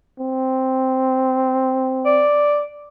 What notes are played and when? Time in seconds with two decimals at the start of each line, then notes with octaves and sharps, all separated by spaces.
0.20 C4
2.05 D5